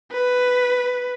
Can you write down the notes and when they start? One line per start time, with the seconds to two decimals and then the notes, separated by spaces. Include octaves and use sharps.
0.12 B4